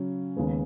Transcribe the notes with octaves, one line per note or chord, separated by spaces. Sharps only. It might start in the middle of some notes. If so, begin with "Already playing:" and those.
Already playing: C#3 F#3 C#4
D#2 C#3 G#3 B3